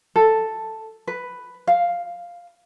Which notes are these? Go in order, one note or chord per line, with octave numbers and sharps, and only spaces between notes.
A4
B4
F5